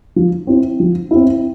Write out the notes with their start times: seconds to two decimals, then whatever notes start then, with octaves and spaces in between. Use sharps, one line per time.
0.16 F3
0.47 C4 E4
0.80 F3
1.11 C4 E4